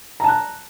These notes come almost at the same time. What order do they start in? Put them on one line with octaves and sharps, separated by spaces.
A#5 A5 F#6